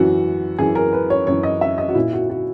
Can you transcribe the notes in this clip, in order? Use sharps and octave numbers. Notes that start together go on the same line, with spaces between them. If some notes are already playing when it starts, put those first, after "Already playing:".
Already playing: F#2 E3 F#4
F#2 E3 G#4
A#4
B4
C#5
F#2 E3 C#5
D#5
E5
D#5
F#4
A#2 E4
F#4
F#4